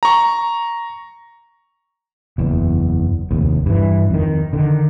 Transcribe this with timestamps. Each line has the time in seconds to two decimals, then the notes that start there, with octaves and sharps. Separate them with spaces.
0.03 A#5 C#6
2.38 F#1 E2
3.31 F1 D#2
3.66 G2 E3
4.10 F2 D#3
4.53 D3 D#3